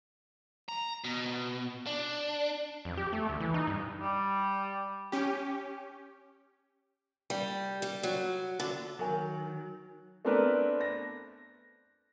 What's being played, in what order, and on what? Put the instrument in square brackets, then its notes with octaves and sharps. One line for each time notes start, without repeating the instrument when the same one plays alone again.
[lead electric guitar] A#5
B2
D4
[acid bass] F2
G4
A3
D2
E3
D#4
G2
[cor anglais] G3
[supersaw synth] C#4 G4
[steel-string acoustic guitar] G3
G3
F#3
D3
[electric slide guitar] D#3 F#3 [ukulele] F#4 A#4 G#5
[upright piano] A3 B3 C4 D4 A#4 B4
A#6